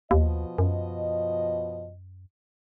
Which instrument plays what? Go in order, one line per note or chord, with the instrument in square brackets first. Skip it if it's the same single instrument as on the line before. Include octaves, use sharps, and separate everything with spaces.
[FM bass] D#2 [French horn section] B2 F3 D#5
[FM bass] F#2